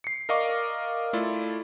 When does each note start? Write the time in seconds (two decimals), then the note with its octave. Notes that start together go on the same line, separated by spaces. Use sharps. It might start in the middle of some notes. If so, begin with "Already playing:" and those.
0.04 C7 C#7
0.29 A#4 D5 D#5 F5 C#6 D6
1.13 A3 E4 F4 A4 D5